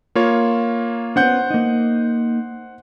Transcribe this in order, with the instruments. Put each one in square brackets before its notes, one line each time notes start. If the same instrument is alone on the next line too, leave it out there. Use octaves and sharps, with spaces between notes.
[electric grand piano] A#3 F4 C#5
[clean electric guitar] B3 C#4 D4 [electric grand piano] C5 F#5 G6
[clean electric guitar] A#3 D#4